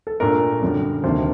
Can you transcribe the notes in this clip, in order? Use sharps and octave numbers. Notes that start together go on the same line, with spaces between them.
A4
A#2 A3 D4 A#4
F#2 D3 G3
D2 C3 D#3 G3 A#3 C5